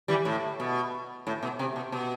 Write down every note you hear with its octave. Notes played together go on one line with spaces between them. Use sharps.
E3 G3
A2
B2
A2
B2
C3
B2
B2